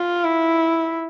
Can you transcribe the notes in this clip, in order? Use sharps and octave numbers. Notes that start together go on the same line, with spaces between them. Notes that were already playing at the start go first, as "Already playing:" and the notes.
Already playing: F4
E4